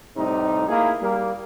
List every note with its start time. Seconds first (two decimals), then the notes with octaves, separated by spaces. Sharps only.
0.17 A2 C3 G3 D#4
0.69 A#3 D#4 E4 G#4 A#4
1.00 G3 A#3